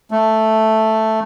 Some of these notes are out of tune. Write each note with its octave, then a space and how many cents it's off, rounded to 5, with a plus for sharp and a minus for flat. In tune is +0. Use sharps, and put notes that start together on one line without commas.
A3 +0